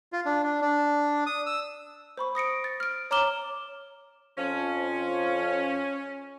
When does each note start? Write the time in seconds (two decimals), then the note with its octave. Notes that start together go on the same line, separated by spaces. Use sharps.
0.13 F4
0.26 D4
0.44 D4
0.61 D4
1.26 D#6
1.46 E6
2.17 C5 B5 C#6
2.35 D#6 A#6 C#7 D7
2.64 A6
2.80 F6 D7
3.11 C#5 A#5 D6 F6 E7 G7
4.38 F2 F3 C#4